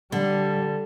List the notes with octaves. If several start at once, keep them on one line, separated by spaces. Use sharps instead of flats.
D3 G3